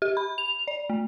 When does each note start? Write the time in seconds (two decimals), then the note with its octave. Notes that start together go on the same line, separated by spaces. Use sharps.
0.02 G4
0.17 B5
0.38 F7
0.68 D5
0.90 A3